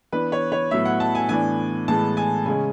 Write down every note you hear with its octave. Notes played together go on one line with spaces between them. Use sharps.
E3 B3 D4 B4
C#5
C#5
A2 F#3 B3 E5
F#5
A5
G#5
A2 E3 B3 D4 G#5
A2 E3 G#3 B3 A5
G#5
C#3 G#3 C#4 G#5